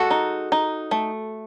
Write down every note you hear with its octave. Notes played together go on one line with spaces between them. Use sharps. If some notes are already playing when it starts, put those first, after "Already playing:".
Already playing: G#3 F#4 A4
D#4
D#4
A3